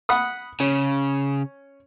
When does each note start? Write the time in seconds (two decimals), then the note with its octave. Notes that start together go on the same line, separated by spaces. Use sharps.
0.09 F#5 B5 D#6
0.60 C#3 C#4